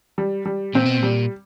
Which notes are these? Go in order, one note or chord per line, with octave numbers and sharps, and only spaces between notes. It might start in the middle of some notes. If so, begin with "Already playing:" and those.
G3
G3
A#2 C4
B2
A#2
G3